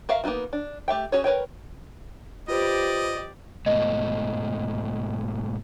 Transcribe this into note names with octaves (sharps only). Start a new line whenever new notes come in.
F#4 A#4 E5 F5
A#3 B3 D#4 E4 F#4
D4
A3 G4 E5 G5
C#4 F#4 G#4 C#5
A#4 B4 C#5 G5
F4 G4 B4 C5 D5 D#5
G#2 B2 A3 D#5